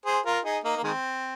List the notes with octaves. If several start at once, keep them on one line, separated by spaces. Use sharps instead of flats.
G#4 C5
F4 A#4
D#4 G#4
A#3 D#4
A#3
D#3 G#3 C4